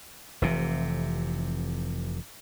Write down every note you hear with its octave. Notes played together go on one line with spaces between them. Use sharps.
F1 C3 E3